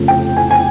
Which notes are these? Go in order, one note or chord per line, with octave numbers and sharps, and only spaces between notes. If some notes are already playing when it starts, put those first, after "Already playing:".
Already playing: F1 F2 C#3 F3
G5
G#5
G#5